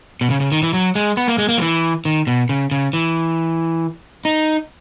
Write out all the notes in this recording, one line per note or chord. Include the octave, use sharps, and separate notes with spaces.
B2
C#3
C#3
D#3
E3
F#3
G#3
B3
A#3
G#3
A#3
F#3
E3
D#3
B2
C#3
C#3
E3
D#4